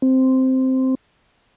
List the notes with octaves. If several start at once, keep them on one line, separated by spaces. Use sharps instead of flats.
C4